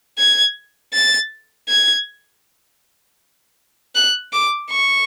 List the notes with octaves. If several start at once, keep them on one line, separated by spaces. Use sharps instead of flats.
G#6
A6
G#6
F#6
D6
C#6